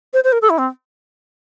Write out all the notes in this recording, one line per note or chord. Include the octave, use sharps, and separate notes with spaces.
C5
C5
A#4
A4
E4
C4